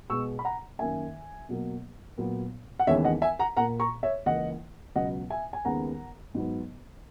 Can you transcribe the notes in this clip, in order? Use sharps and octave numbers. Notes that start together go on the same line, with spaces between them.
B2 G#3 B3 C#6 E6
B5
F#5 A#5
F#2 D#3 A#3 E5 G#5
B2 F#3 A#3
A#2 F#3 B3
F#5
D#2 C#3 E3 G#3 B3 C#5 E5
D#5 F#5
E5 G#5
F#5 A#5
A#2 A#3 F#5 A#5
A#5 C#6
C#5 E5
C#2 C#3 E3 A#3 D#5 F#5
C#2 B2 F#3 B3 D#5 F#5
E5 G#5
G#5
D#2 C#3 G#3 B3 F#5 A#5
G#2 F#3 B3